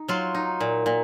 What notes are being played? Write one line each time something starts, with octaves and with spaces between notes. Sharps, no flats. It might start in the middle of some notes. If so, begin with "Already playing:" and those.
Already playing: D#4
F#3 F4
D#4
A#2
A#2